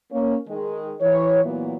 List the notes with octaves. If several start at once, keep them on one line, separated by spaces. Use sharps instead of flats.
A#3 C#4
D#3 G#3
E3 C#5
A#2 E3 F#3 B3